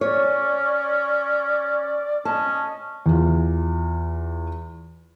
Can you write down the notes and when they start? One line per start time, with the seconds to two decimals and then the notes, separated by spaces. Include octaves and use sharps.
0.01 C#4 C#5 D5
2.25 C#4 D#5 A5
3.06 E2 F4